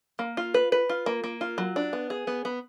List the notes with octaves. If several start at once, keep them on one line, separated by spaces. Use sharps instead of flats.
A#3
F4
B4
B4
F4
A#3
A#3
F4
F#3
D4
B3
G#4
B3
B3